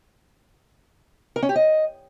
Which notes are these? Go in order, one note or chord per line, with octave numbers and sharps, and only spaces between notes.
A#4
C#4
G4
D#5